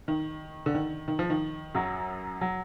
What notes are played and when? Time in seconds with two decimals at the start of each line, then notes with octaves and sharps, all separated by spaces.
0.08 D#3
0.66 D3
0.75 D#3
1.08 D#3
1.19 F3
1.30 D#3
1.75 F#2 F#3
2.41 F#3